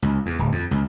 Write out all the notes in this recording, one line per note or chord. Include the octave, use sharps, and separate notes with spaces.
C#2
E2
D1
F2
C#2